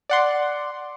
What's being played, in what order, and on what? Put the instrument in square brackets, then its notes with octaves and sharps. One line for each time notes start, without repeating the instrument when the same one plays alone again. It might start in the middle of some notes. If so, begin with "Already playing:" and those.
[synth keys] D5 F#5 C6